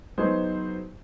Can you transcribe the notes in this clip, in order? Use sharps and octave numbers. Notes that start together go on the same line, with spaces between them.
F#3 B3 D#4 G#4 C5